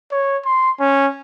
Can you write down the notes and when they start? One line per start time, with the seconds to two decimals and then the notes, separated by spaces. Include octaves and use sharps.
0.12 C#5
0.45 C6
0.80 C#4